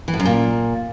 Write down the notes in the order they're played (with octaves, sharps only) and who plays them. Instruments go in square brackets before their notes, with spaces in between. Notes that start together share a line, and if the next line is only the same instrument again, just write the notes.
[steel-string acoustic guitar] E3
A2
F#2
A#2